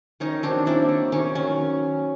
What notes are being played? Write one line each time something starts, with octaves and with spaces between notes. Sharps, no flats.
D#3 C#4 D#4
F#3 C4 D4
A#3 D4 E4
D#3
D#3 C#4
F#3 C#4